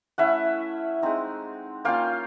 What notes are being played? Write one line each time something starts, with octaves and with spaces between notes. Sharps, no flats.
A3 C#4 E4 E5 F#5
G#3 C4 D#4
A#3 C#4 F4 F5 G5